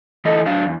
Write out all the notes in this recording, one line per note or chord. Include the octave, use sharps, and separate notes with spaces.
E3 A3 E4 A4 D#5
F#3 D4 F5
E2